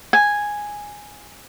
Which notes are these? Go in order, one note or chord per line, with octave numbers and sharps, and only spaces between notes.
G#5